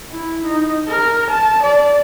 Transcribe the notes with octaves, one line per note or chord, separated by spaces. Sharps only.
E4
D#4
A#4
A5
D5